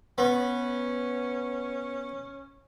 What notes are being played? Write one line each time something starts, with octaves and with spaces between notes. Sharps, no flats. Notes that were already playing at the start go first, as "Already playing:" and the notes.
B3 C#4